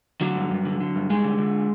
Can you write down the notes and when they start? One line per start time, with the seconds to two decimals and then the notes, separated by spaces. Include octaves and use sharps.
0.21 D3 F#3
0.36 G2
0.51 G2
0.65 D3
0.80 D3
0.95 G2
1.10 G2 G#3
1.24 D3
1.38 D3